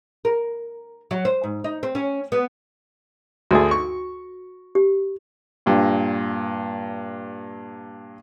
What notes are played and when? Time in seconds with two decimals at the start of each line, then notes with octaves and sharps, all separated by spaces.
0.25 A#4
1.11 F#3
1.25 C5
1.44 G#2
1.64 D#4
1.83 C4
1.95 C#4
2.32 B3
3.51 D2 A3 F#4 G#4
3.71 C#6
4.75 G4
5.66 G2 A#2